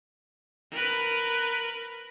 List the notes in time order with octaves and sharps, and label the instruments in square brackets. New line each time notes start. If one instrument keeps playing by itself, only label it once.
[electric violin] A#4 B4